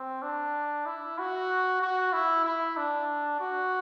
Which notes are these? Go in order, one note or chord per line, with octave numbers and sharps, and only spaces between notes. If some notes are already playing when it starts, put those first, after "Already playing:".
Already playing: C4
D4
E4
F#4
F#4
E4
E4
D4
F#4